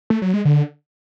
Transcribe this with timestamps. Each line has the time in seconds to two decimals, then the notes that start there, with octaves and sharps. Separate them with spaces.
0.10 A3
0.22 F#3
0.34 G#3
0.45 D3